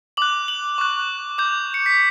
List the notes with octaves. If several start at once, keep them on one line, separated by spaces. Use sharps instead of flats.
D6 F#6 F#7
F#7
C#6 F#6
D6 G6
C#7
B6